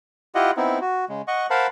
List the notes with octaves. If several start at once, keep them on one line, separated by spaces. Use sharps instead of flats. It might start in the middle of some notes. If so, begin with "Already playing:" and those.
E4 F4 G4 D#5 F#5
B3 C4 D#4 E4
F#4
C#3 G#3
D#5 F#5 C#6
A#4 C5 F5 F#5 A5 B5